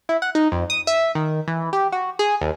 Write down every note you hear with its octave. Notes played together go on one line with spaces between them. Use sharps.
E4
F#5
D#4
F2
D#6
E5
D#3
E3
G4
F#4
G#4
D#2